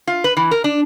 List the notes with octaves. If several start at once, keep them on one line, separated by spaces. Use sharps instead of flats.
F4
B4
E3
A#4
D4